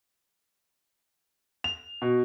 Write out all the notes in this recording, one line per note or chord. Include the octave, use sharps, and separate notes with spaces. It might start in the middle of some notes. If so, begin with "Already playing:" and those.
F7
B2